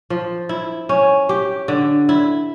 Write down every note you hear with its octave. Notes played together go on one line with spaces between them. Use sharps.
F3
E4
C#4
G4
D3
E4